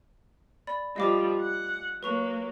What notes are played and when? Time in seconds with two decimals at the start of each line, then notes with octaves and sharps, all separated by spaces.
0.67 D5 B5 A6
0.96 F3 G3 D#5 F5 D6
1.40 F#5
2.03 F#3 A#3 B4 C#6 F7